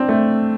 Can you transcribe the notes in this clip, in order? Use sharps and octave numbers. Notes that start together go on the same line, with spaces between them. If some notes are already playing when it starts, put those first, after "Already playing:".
Already playing: C4 D4
A3